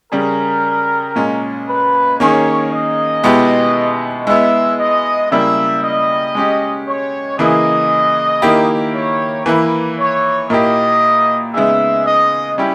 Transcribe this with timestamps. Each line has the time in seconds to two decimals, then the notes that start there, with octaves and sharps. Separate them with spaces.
0.12 C#3 G3 C#4 G#4 A#4
1.16 A#2 G#3 C#4
1.68 B4
2.20 D#3 A#3 C#4 G#4 C#5
2.72 D#5
3.24 B2 G#3 B3 E4 G4
4.27 G#3 B3 E4 E5
4.79 D#5
5.31 C#3 G3 A#3 E4 E5
5.83 D#5
6.35 G#3 C#4 G4
6.87 C#5
7.39 C#3 E3 A#3 E4 G#4 D#5
8.42 D#3 A#3 E4 G4
8.95 C#5
9.46 E3 A#3 E4 B4
9.98 C#5
10.50 A#2 A#3 E4 G4 D#5
11.54 C#3 G#3 B3 D#4 G#4 E5
12.06 D#5
12.58 G3 C#4 E4 G4